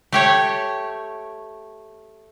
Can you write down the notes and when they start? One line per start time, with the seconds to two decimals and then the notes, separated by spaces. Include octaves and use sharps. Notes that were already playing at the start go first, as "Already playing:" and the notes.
0.12 A3 G4 C#5